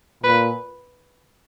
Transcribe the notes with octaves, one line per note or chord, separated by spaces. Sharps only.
A#2 B4